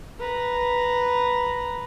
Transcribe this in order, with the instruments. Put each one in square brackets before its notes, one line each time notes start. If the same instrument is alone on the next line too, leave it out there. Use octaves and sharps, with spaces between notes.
[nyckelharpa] B4 A#5